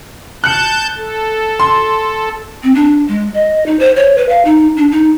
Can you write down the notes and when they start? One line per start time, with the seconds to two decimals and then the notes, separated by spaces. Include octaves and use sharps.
0.44 A5 F#6 G6 C#7
0.97 A4
1.60 C6
2.63 C4
2.75 D4
3.08 G#3
3.34 D#5
3.66 D#4
3.79 C5
3.96 C#5
4.18 B4
4.29 F5
4.45 D#4
4.77 D4
4.92 D#4